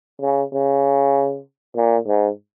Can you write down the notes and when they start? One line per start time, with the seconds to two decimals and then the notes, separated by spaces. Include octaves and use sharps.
0.21 C#3
0.53 C#3
1.76 A#2
2.07 G#2